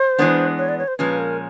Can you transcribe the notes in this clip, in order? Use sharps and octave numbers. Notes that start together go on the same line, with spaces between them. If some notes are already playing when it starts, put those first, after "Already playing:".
Already playing: C5
E3 G#3 B3 D4
C#5
D5
C#5
C5
A#2 F3 G#3 C#4 B4
A#4